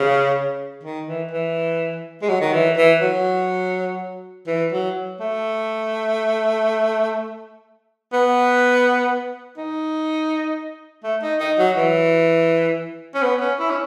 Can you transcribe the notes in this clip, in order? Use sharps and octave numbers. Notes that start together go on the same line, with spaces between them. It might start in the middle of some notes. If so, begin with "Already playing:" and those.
Already playing: C#3
D#3
E3
E3
G#3
F#3
D#3
E3
E3
F#3
E3
F#3
A3
B3
D#4
A3
D#4
D#4
F#3
E3
C#4
B3
C#4
E4
C#4